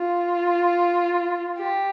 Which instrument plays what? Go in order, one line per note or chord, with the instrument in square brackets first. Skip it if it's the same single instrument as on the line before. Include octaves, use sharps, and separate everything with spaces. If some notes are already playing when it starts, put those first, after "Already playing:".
Already playing: [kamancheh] F4
G4